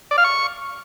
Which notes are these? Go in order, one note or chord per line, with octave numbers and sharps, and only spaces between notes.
D5
F5
C#6